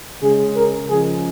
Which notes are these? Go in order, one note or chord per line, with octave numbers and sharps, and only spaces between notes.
C#3 G#3 G#4
A#4
C#3 F3 G#3 G#4